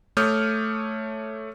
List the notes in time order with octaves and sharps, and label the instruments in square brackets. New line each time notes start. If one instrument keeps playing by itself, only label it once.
[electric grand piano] A3 C#5 D6 D#6 F6 G6